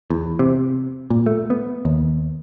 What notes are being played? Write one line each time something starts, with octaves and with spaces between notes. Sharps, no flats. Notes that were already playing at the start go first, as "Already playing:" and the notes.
E2
C3
A#2
A3
B3
D#2